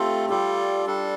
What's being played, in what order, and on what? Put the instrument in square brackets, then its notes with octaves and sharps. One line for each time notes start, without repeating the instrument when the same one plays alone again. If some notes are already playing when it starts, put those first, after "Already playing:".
Already playing: [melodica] A3 C4 F4 A4 [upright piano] G4
[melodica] G3 F4 A4 D5 [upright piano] G4
[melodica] G3 D4 A4